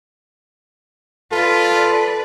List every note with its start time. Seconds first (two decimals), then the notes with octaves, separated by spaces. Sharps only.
1.32 F4 A4 B4 D5